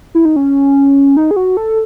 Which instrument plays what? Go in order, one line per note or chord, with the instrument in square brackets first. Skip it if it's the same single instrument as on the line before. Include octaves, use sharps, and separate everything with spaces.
[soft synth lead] E4
D#4
C#4
D#4
G#4
F#4
A4